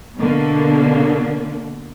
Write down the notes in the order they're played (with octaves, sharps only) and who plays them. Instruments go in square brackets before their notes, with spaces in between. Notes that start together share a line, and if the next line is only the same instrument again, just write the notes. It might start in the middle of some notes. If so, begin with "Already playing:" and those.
[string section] B2 D3 A#3